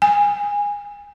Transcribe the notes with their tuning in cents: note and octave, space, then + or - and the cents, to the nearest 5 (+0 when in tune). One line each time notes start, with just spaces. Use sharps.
G#5 -20